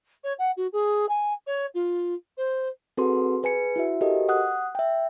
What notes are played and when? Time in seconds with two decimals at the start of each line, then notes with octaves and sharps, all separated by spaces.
0.24 C#5
0.39 F#5
0.57 F#4
0.73 G#4
1.09 G#5
1.47 C#5
1.74 F4
2.38 C5
2.97 C4 F#4 G#4 A4 B4 C6
3.43 G#4 B4 G#5 C#7
3.76 E4 F#4 E5
4.01 F#4 G4 A4 A#4 C5 D#5
4.29 F#5 D#6 F#6
4.75 E5 G5